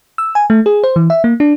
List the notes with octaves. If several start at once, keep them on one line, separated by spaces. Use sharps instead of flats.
E6
G#5
A3
G#4
C5
E3
E5
A#3
D4